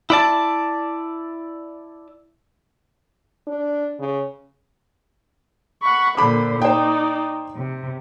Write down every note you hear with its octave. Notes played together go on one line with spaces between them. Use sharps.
E4 D5 A5
D4
C#3
F#5 B5 C#6
A#2 D3 C5 B5 D6
D#4 C5 D5 G5
C3